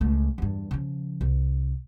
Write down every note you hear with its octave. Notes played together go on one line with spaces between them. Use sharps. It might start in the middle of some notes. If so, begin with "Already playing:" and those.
C#2 A3
E2 G2
C#3 F3
C2